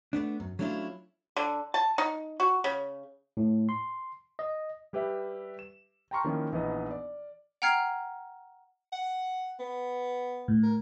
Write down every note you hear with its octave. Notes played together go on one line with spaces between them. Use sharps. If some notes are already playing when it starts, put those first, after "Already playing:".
A3 B3 D4
F#2
F#3 A3 C#4 D4 E4 F4
D3
A5
D#4
F#4
C#3
A2
C6
D#5
G3 G4 B4 E5
E7
G5 A5 A#5 C6 C#6 F6
D#3 F3 A#3 C#4 D#4 E4
A#1 E3 B3 D#4 D#5
D5
F#5 G5 A#5 F6 G#6 C7
F#5
B3
A2
A#4